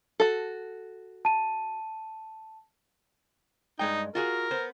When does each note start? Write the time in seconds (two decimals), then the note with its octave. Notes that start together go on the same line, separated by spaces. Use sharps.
0.20 F#4 A4
1.25 A5 D#7
3.79 G2 G#3 D#4 G5
4.15 F4 F#4 G#4 A#4
4.51 B3 C5